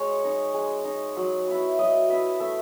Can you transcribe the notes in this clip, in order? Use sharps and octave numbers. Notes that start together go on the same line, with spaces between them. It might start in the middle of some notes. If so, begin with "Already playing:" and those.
Already playing: G#3 C#5
D#4
G#3
D#4
F#3
B3 E4
F#3 D#5
B3 E4 E5
A3 E5